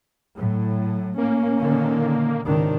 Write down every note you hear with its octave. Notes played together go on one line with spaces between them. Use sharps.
A2 F#3
A#3 C#4
A#2 D3 D#3
C#2 G#2 C3 D#3 D4